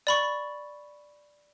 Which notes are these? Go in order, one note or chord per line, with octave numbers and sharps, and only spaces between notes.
D5 B5 C#6